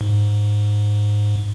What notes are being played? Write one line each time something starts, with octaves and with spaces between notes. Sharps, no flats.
G#2